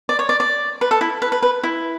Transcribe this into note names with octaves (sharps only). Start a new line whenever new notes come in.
D5
C#5
D5
D5
B4
A4
E4
B4
B4
B4
E4